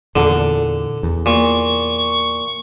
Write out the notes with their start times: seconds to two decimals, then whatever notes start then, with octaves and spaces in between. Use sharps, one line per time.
0.16 E2 A#2 D3
1.03 E2
1.26 A#2 C#6